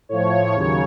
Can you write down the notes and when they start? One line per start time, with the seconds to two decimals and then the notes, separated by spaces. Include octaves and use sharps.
0.09 A2 F3 C#5
0.53 D#2 C#3 F#3 C#5